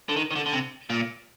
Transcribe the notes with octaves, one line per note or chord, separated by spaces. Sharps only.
D3
D#3
D#3
D3
D3
C3
A#2